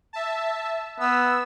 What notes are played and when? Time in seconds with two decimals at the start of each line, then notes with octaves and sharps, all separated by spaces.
0.13 E5 A5
1.00 B3 E6